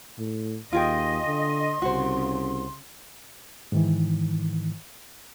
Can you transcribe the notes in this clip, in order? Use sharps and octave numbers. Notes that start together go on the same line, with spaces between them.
A2
D#2 F4 G#4 D#5 G5 C6
D3
C2 C#3 F#4 C5
G#2 D#3 E3